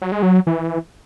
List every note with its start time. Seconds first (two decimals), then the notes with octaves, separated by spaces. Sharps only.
0.02 F#3
0.12 G#3
0.22 F#3
0.47 E3